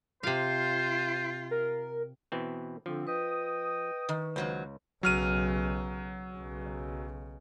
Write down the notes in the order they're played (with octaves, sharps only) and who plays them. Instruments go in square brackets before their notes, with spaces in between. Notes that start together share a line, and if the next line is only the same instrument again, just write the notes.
[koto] C3 F5 [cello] F4 [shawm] C5
[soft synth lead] A#4
[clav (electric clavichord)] B2 E3 C4
[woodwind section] D3 C4 [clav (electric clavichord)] F3 [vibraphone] D4
[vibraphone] B4 [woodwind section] D#5 G5 D#6
[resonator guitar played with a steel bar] D#3
[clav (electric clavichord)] C#2 [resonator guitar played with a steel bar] D#3 F#3 C5
[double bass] B1 C#3 [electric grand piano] F#3 F6 D#7
[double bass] B1 C#3